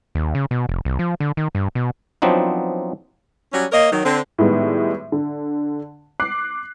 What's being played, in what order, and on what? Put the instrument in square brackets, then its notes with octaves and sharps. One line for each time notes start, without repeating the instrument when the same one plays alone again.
[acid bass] D#2
C#3
B2
F1
C2
F3
D3
D#3
G2
B2
[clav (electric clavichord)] F3 F#3 B3 C4 D4 D#4
[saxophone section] F#3 G3 C#4
A#3 A#4 C#5 D#5
D#3 F#3
D3 C4
[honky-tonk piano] A2 D#3 G3 G#3 B3
D3
D6 F#6 C7